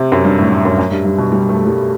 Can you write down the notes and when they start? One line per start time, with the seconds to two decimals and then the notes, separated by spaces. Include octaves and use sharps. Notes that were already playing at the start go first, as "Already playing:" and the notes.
Already playing: C3
0.12 F#2
0.25 G2
0.39 A2
0.52 A2
0.65 F#2
0.78 F#2
0.91 G2
1.05 G2
1.18 B2
1.32 G3
1.49 A3
1.67 G3